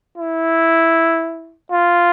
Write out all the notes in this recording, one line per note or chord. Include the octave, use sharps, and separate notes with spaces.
E4
F4